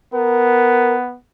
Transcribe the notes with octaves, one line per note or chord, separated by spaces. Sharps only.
B3 A#4